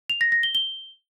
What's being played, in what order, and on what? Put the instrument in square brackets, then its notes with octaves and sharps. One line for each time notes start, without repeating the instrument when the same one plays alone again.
[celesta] F7
A#6
A#6
G7
G7